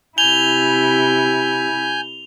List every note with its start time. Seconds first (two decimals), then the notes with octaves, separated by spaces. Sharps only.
0.18 C3 E4 G#5 G6 F7 G7